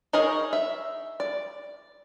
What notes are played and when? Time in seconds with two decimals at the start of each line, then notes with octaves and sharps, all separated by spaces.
0.13 D#4 G#4 A#4 C#5 D#5
0.53 E5
1.20 D5